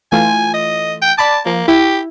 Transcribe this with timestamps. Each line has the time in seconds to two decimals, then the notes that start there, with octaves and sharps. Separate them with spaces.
0.12 E3 A3 F4 G#5
0.54 D#5
1.02 G5
1.18 D5 A5 B5 D6
1.46 F3 A#3
1.68 E4 G4